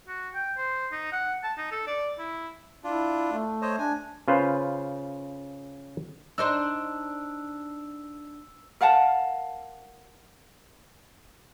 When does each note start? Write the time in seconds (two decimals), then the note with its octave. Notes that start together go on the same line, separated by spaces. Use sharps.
0.08 F#4
0.35 G5
0.57 C5
0.92 D#4
1.12 F#5
1.43 A5
1.58 D#4
1.71 A4
1.87 D5
2.18 E4
2.84 D4 E4 F4
3.32 A3
3.62 C5 C#5 D#5
3.79 D4 G#5
4.28 C#3 F4 B4 C5 F5
6.38 D4 D#4 C5 E6
8.81 A#4 F5 F#5 A5